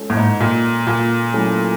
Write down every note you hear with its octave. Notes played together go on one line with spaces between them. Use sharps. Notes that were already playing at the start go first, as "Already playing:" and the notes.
Already playing: G#3 C#4 F4 A4 C#5
A2
G#2
A#2
A#2
F#3 A3 C#4 E4 G#4